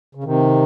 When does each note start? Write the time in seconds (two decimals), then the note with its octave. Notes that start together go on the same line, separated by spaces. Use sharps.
0.15 C#3
0.24 C3 D#3